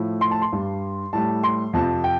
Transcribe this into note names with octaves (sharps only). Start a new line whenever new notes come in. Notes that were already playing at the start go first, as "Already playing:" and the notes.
Already playing: A2 F3
C6
A5
C6
G2 G3
A2 G3 A5
C6
F2 C3 F3 A5
G5